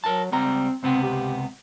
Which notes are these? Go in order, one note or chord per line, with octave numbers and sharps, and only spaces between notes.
F#3 A#4 A5
C#2 G3 C4 A#5
C#2 C3 B3 C4
G4